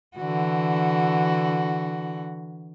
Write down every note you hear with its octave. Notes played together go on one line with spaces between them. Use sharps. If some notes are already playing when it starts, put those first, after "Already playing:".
D3 E3 F#4